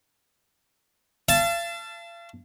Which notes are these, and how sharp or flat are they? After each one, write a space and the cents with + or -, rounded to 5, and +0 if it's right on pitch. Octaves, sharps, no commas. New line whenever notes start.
F5 -40 A5 +0